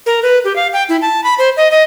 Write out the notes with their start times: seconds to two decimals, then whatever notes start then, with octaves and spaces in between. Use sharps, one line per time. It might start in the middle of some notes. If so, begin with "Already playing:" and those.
0.06 A#4
0.23 B4
0.44 G4
0.56 F5
0.73 G5
0.89 E4
1.02 A5
1.24 B5
1.38 C5
1.57 D#5
1.71 D#5